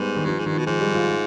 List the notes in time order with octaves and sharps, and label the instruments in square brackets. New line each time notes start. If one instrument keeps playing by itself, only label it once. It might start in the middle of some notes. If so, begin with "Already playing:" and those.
Already playing: [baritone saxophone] G#2 [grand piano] G3 G#3 B3
[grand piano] D#3
[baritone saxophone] G2 [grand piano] F3
[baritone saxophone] G#2
[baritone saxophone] G2 [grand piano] D#3
[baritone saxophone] B2
[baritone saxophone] G#2 [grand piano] F3
[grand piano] G3
F4